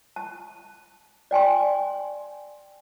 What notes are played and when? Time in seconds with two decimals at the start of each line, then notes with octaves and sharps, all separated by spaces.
0.16 A5
1.31 D5 G5 G#5 C6